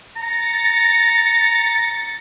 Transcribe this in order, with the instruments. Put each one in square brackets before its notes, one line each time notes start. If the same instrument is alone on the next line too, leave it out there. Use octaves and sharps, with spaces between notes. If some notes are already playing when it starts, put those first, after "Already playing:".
[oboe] A#5 [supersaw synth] A6 A#6 C#7